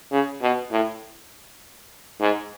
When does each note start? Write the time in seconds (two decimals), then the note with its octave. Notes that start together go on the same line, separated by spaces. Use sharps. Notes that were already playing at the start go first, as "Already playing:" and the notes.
0.12 C#3
0.42 B2
0.71 A2
2.21 G#2